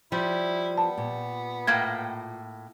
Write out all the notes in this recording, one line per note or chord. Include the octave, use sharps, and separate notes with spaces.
F3 G3 E4
B3 A5
A#2
A2 A#3 G5 G#6